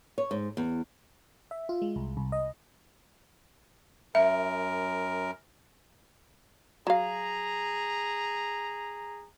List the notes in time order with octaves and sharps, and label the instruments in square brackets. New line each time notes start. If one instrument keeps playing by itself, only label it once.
[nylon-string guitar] C#5
G#2
E2
[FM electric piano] E5
F4
G#3
C2
C2
D#5
[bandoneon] F#2 A#4 [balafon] E5
[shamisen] F#3 F5 [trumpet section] G#4 A#5